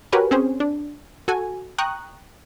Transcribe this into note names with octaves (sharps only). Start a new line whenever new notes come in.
F#4 G4 A#4 B4 C#5 G#5
C4 C#4 G#4 C5
D4
F#4 A4 G#5
G5 A#5 C#6 D#6 F#6